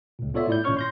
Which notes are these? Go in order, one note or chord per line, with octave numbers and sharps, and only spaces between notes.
C#2 A#2
B3 F4 A4 C#5 D5 E5
A2 E4 D5 G6
G#1 A#2 C#4 C#5 C#6 F6
C6 G6 A#6